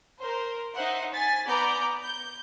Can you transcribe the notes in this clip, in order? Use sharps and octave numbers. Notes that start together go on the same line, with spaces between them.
A#4 C5
D#4 C5 E5 F#5
G#5 A6 B6
B3 B4 D5 A#5 D6 G6
G6